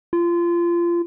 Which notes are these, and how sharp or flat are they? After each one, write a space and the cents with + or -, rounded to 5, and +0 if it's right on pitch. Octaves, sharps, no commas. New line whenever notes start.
F4 -25